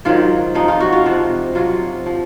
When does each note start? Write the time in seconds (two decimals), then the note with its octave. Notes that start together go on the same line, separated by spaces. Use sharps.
0.05 G#2 D#3 F#3 F4
0.55 C3 F3 D#4
0.68 F4
0.80 F#4
0.93 F4
1.06 C3 F3
1.55 C3 F#3 F4
2.06 F3